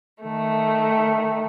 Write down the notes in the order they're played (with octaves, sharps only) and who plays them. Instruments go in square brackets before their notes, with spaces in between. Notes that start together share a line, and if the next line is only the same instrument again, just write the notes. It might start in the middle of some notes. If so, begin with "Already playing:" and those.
[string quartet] D#3 A3